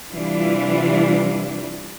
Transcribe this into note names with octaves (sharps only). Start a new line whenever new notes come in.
C3 E3 G3 D4 E4 F4